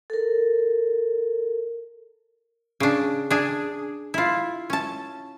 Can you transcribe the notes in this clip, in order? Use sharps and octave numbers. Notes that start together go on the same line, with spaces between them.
A4 A#4
C#3 D4
D4 G#4
E4 F4
C#4 A5